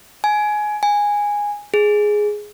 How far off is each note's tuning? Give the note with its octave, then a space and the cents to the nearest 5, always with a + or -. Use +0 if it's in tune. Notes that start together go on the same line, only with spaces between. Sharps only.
G#5 +20
G#5 -10
G#4 +5